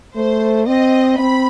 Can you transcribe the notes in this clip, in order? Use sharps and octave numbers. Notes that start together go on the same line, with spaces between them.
A3 C5
C4 D#5
C4 B5